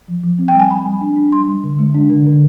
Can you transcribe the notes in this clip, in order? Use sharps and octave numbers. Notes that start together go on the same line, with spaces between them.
F3
F3
C4
G5
G3 G#5
G3 B5
G3
D4
D4
G3 C6
G3
D3
G#3
D4
D3
D3